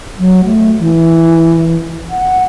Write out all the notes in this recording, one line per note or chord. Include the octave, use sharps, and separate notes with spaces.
F#3
A3
E3
F#5